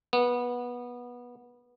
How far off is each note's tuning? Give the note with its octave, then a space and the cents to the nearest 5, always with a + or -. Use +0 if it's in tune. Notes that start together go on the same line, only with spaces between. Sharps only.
B3 -15